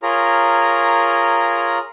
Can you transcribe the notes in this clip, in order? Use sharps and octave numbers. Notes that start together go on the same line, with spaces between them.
F4 G#4 A#4 C#5 A#5